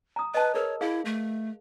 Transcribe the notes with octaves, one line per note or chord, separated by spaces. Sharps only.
A#5 D#6
B4 D#5 A5
G#4 A#4 B4 C#5
E4 G#4 F5
A3